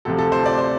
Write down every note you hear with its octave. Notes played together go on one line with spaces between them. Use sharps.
D2 C3 F3 A4
A4
C5
D5
C5